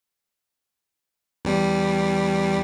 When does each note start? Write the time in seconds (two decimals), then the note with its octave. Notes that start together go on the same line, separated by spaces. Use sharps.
1.45 E2 G3